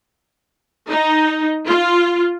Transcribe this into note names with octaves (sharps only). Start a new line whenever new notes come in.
D#4
F4